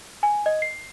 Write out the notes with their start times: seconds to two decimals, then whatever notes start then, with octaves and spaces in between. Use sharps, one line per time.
0.23 G#5
0.46 D#5
0.62 C7